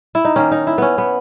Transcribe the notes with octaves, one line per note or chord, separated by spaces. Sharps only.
E4
D#4
D#3 A#3 C#4
D#4
E4
B3 C#4
B3